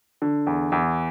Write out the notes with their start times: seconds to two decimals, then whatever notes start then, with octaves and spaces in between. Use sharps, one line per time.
0.22 D3
0.47 E2
0.72 E2